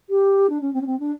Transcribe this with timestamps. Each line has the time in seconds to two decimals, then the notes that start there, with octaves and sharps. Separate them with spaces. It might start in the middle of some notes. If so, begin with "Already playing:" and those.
0.10 G4
0.50 D4
0.61 C#4
0.74 C4
0.81 C#4
0.87 C4
1.00 D4